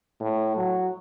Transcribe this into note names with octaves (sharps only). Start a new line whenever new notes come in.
A2
F#3